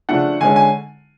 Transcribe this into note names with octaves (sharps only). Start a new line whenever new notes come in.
C#3 F3 A3 D4 F#5
D3 G#3 C#4 G#5
G#5